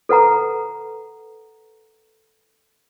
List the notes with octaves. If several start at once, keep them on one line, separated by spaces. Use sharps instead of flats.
A4 B4 F#5 A#5